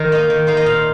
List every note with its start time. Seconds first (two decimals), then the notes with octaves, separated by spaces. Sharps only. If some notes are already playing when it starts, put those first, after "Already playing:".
Already playing: D#3 A#4 C5
0.12 A#3 D#4 D#5
0.30 D#3
0.47 A#3 D#4 C5
0.57 D#5
0.66 A#2 F5